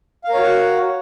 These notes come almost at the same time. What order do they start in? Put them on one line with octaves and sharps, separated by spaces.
F5 A#4 C#5 F#4 F#5